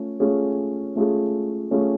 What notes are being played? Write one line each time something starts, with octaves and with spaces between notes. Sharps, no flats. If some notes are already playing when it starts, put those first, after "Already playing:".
Already playing: A3 C#4 F4
A3 C#4 F4 G#4
A3 C#4 F4 G#4
A3 C#4 F4 G#4